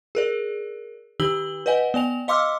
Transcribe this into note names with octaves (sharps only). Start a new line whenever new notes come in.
G#4 A#4 D5
D#3 D#4 G4 E6 F#7 G7
B4 D5 D#5 F#5 G#5
B3 D5 G#5 F7
D#5 F5 C6 D6 E6 F6